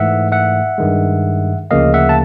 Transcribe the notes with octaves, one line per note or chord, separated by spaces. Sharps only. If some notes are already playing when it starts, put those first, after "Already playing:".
Already playing: G#2 E3 A3 E5 F#5
E5 F#5
G2 D#3 G#3
D2 C#3 F3 A#3 D#5 F5
E5 F#5
A5